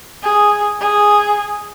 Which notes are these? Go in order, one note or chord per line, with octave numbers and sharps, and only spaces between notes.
G#4
G#4